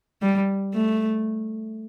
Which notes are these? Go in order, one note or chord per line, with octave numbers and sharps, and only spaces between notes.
G3
A3